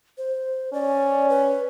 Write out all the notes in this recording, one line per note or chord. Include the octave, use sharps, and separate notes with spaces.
C5
C#4 D5
B4